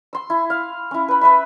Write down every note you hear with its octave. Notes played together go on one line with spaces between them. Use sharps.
C6 E6
E4
F5
C#4 E4
B4 B5
B4 E5 B5